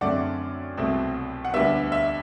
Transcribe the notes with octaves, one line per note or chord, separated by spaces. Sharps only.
F#2 D3 A3 C4 D5 F#5
C2 B2 A3 C4
F#5
D2 D3 G3 B3 E5
E5